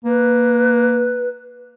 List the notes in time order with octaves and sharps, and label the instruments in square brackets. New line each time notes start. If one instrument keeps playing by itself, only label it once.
[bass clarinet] A#3 [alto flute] B4